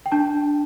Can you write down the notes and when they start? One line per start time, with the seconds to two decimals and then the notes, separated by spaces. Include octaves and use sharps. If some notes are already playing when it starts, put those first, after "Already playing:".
0.06 G5
0.12 D4 A5